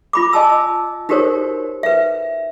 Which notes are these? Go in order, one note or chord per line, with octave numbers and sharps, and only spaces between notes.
F4 B5 D6
D#5 G#5 A5 E6
D#4 F#4 G4 A#4 C5 C#5
B4 E5